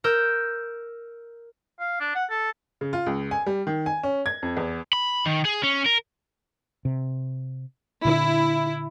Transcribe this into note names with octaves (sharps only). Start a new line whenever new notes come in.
A#4 E6 G6
F5
D4
F#5
A4
C#3
F4
C#2
G#5
G3
D#3
G#5
C#4
G#6
F2
E2
B5
D#3
G#4
C#4
A#4
C3
A#2 D3 E4